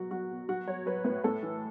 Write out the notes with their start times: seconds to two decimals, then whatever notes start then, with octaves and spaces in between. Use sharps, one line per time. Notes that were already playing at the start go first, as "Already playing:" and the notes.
Already playing: B2 F#3 F#4
0.11 F#3 F#4
0.31 B2
0.49 F#3 F#4
0.67 F#3 C#5
0.86 F#3 B4
1.05 A2 B4
1.24 A2 A4
1.43 E3